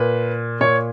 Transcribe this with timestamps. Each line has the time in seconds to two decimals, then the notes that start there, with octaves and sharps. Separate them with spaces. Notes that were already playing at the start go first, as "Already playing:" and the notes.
Already playing: A#2 B4
0.61 A#2 C#5